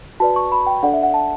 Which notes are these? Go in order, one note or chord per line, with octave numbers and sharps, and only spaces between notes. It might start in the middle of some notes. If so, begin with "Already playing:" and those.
F#4 B4 D5 A5
C#6
B5
G5
D4 A4 D5 F#5
E5
F#5
A5